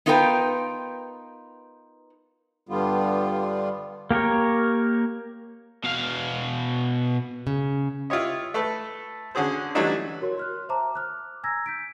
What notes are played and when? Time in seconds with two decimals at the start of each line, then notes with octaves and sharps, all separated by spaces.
0.06 B3 D#4 F4 A#4 B4 G5
2.69 G2 D3 G3 B3 F4
4.11 A#3 G4 A#4 C#5
5.84 B2 F5
7.47 C#3
8.10 E4 F4 G4 C#5 D#5
8.54 A3 A4 B4
9.35 D3 C#4 F#4 G#4 C5
9.75 E3 F#3 G3 A3 D4 D#4
10.21 F#4 A#4 C#5 C6
10.37 C6 F6 F#6
10.69 C5 E5 A5 A#5 D6
10.95 D6 F6 F#6
11.43 G#5 A#5 E6 G#6 A#6
11.66 G6 B6 D7